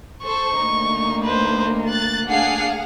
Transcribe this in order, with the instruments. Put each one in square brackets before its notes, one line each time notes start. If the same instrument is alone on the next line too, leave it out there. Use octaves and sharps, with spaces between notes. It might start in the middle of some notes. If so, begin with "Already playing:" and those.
[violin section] A4 C5 [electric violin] C#6
[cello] D2 A#3 [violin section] D#4
[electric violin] B4 C5
[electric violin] F#6 [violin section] A6
[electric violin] D4 C7 [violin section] G#4 F5 F#5